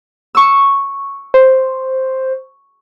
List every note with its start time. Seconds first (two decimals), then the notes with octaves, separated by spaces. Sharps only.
0.35 C#6 E6
1.34 C5